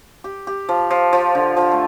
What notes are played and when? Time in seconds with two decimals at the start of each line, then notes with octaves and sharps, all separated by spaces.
0.24 G4
0.47 G4
0.69 F3
0.91 F3
1.13 F3
1.35 D3
1.57 F3
1.72 A3